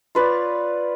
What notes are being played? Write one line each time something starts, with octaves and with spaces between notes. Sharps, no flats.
F4 B4 C#5 D5